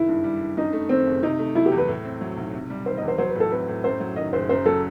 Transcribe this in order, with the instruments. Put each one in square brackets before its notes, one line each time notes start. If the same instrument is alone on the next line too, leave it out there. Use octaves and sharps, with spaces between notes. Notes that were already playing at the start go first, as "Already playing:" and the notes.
Already playing: [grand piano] F#1 D#3 [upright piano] E4
[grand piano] G2
G3
G2
[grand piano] F#2 [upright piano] D#4
[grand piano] A3
[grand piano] D#3 [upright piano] C4
[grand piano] F#1
[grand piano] C3 [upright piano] D#4
[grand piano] A3
[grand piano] F#3 [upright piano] E4
[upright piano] G4
[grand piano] E2
[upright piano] B4
[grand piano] A2
C4
F#3
B1
C3
G3
[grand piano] D#3 [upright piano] C5
[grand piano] E2 [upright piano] D#5
[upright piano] C5
[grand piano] F#3 [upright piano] C5
[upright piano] B4
[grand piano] A2 [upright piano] A4
[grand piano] C4 [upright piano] B4
[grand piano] A2
[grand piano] F#2 [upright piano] C5
[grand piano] F#3
[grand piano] D#3 [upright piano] D#5
[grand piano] F#1 [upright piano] C5
[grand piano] F#2 [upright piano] C5
[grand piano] F#3 [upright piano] A4